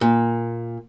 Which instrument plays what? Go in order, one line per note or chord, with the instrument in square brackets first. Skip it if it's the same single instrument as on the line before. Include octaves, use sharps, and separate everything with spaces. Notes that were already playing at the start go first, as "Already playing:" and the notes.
[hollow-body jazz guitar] A#2